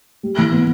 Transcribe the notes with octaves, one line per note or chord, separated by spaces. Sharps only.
G3
E3
B3